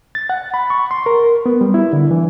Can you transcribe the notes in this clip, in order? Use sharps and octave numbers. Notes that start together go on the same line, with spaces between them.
A6
F#5
B5
C#6
C6
A#4
B3
G3
E4
D3
E3